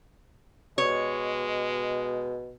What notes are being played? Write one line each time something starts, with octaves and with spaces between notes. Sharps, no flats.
B2 G#3 C#5